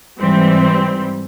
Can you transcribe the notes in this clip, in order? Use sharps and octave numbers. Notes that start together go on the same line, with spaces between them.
G#2 E3 G3 C4